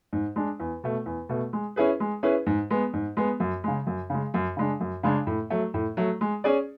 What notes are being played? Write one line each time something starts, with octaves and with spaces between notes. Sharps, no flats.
G#2
G#3 D4
E2
B2 A3
E2
B2 A3
G#3
C#4 E4 G#4 B4
G#3
C#4 E4 G#4 B4
G#2
G#3 B3
G#2
G#3 B3
F#2
C#3 G#3
F#2
C#3 G#3
F#2
C#3 G#3 D4
F#2
C#3 G#3 D4
A2
F#3 A3
A2
F#3 A3
G#3
C#4 G#4 D5